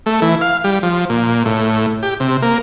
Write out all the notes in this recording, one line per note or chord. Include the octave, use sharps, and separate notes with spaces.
A3
E3
F5
G3
F3
A#2
A2
G4
C3
A#3